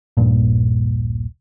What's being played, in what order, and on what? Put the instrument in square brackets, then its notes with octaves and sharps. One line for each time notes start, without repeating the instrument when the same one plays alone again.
[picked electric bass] D#1 A#1 G2 A#2